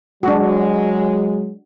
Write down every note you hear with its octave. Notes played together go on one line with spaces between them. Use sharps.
F#3 G#3 D4 F#4